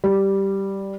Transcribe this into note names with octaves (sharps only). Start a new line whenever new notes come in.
G3